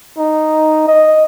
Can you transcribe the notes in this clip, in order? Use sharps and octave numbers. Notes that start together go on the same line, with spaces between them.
D#4
D#5